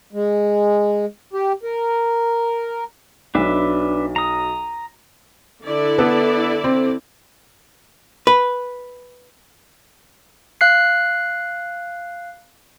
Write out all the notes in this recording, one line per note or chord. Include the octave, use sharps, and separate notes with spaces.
G#3
G4
A#4
B1 F#3 D4 B4 E5
A#5 D#6
D3 E4 D5
B3 A4
C4
B4
F5 F#6 C7